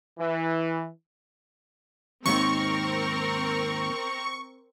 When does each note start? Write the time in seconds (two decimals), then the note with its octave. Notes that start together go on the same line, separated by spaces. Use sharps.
0.18 E3
2.26 D#2 G#2 D#3 C4 A#4 C#6